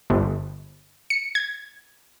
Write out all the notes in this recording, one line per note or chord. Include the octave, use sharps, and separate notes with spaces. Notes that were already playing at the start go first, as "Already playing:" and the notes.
G1
C#7
G#6